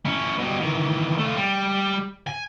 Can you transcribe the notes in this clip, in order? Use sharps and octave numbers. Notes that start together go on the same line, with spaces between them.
C#4 E4
B2 G3
D#3 E3
A3 F4
G3
G#5